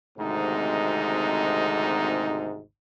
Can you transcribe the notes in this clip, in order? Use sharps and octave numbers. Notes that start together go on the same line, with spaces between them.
G#1 D2 G#2 C3 D#4